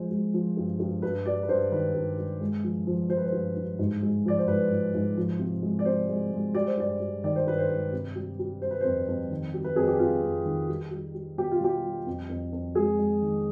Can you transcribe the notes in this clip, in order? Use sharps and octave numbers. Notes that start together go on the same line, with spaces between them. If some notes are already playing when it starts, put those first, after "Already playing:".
Already playing: F3 G#3 C5
G#3
F3
G2
G2
G2 B4
G3 D5
B4
G2 C5
D#3 B4
G2
G2
G#3
F3
F3
F3 C5
B4
C5
G2
G2
G#2
G#3
F3 D5
C5
G#2 B4
G#2
G#2
F3
C3
G#3
D5
C3 C5
G#3
G#3
G3 D5
C5
G2 D5
G3
D#3 D5
C5
G2 B4
C5
G2
C3
G3
G3
G3 C5
B4
F2 C5
F2
D#3
G3
B4
F2 G#4
G4
F2 F4
F2
D#3
G3
G3
G3
B2 G4
F4
B2 G4
G3
F2
F2
F2
G#3 G#4
G#3
D#3